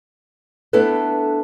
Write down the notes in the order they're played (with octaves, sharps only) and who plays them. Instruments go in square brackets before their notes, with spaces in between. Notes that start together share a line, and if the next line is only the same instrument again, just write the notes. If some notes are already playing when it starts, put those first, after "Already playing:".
[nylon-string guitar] A3 B3 D4 E4 A4 B4